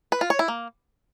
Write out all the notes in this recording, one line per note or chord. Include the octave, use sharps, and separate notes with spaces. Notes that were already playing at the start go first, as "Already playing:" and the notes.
B4
F4
C#5
E4
A#3